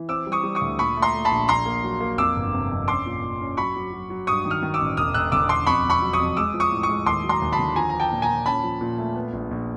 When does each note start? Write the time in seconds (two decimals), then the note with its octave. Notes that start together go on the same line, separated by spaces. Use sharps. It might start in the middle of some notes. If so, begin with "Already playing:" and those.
Already playing: E3
0.09 C4 D6 E6
0.27 G3
0.32 C#6 D#6
0.43 G3
0.55 C#6 D#6
0.61 D2
0.79 A#2 B5 C#6
0.97 A3
1.02 A#5 C6
1.14 A3
1.25 A5 B5
1.31 A#1
1.48 A#1 A#5 C6
1.66 A#3
1.84 F#3
2.00 A#3
2.18 F2 D6 E6
2.36 G1
2.53 C3
2.71 F2
2.88 C#4 C6 D6
3.06 A#2
3.22 A#2
3.41 C#4
3.57 F#3 B5 C#6
3.76 F#3
3.92 F#3
4.10 F#3
4.27 G2 C#6 D#6
4.45 D#3
4.50 D#6 F6
4.62 D#3
4.74 D6 E6
4.80 A1
4.97 E1 D#6 F6
5.14 E1 E6 F#6
5.32 D3 D6 E6
5.49 E1 C6 D6
5.67 F2 B5 C#6
5.85 F2
5.90 B5 C#6
6.02 F#3
6.13 C#6 D#6
6.20 F2
6.37 G#3 D6 E6
6.54 F3
6.60 C#6 D#6
6.72 A2
6.83 C#6 D#6
6.89 G#3
7.06 D#2 C6 D6
7.24 F#3
7.29 A#5 C6
7.42 D#2
7.52 A5 B5
7.59 D3
7.76 F3 G#5 A#5
7.89 F3 A#5
8.00 G5 A5
8.11 A#2
8.22 G#5 A#5
8.29 A#2
8.46 C#4 A5 B5
8.63 F3
8.81 A#2
8.98 A3
9.15 B3
9.33 A#1
9.51 A#1